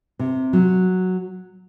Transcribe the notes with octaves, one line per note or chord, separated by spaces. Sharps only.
C3
F#3